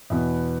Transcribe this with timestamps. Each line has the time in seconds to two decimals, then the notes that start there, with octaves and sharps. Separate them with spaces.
0.10 E2 B2 B3